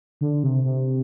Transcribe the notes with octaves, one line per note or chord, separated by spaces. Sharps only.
D3
C3
C3